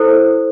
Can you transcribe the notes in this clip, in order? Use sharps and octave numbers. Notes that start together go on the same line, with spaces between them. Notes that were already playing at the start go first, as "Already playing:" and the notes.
Already playing: E4 A4 C5